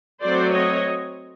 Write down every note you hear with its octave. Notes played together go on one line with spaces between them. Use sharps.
F#3 A3 C4 C5 D5
C#5 D#5